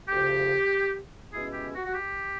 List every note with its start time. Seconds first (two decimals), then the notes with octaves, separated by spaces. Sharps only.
0.09 D2 C#3 F3 G4
1.33 B2 G#3 C#4 E4 G#4
1.54 G4
1.75 F#4
1.86 F#4
1.95 G4